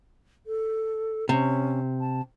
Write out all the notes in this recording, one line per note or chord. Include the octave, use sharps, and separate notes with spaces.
A4
C3 C#4
A5